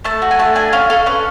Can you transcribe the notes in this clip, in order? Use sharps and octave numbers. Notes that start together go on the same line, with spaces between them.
A3 A5
F#4
G#5
A3 A5
D4 G#5
C#4 F5
A4 F5
C#4 B4